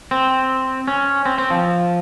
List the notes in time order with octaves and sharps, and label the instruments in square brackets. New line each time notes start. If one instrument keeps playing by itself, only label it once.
[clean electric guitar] C4
C#4
C4
C4
F3